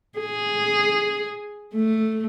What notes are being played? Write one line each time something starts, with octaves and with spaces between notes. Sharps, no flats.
G#4
A3